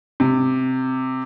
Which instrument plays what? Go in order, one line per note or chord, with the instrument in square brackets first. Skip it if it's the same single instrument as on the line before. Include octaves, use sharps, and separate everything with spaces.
[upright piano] C3